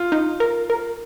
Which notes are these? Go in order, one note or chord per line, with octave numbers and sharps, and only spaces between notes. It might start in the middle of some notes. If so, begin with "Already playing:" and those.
Already playing: F4
D#4
A#4
A#4